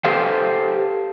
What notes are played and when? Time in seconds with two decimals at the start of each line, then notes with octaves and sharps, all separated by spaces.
0.05 G4 A4 B4 C5 F5 G5